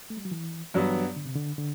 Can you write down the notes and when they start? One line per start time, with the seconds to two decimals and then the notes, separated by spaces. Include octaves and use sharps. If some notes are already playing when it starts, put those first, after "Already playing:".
0.10 A3
0.17 G3
0.25 F#3
0.31 E3
0.74 G2 E3 F#3 B3
1.16 D3
1.25 C3
1.35 D3
1.58 D3